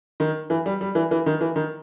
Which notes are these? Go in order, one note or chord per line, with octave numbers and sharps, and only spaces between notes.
D#3
E3
G3
G3
E3
E3
D#3
E3
D#3